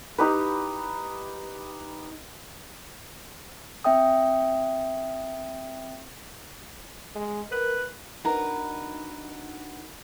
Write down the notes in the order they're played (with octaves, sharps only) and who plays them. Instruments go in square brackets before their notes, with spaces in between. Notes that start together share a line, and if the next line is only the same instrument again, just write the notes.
[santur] D#4 G4 B4
[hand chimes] C4 E5 G5 D#6
[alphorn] G#3
[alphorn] A#4 [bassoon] B4
[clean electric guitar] D4 D#4 F#4 [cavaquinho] A#4 B4